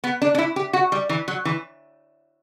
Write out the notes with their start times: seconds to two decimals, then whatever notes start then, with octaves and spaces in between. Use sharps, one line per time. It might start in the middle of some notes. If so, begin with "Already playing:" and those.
0.04 B3
0.22 D4
0.35 D4
0.38 E4
0.56 G4
0.73 F#4
0.92 G3
1.09 E3
1.28 F#3
1.45 E3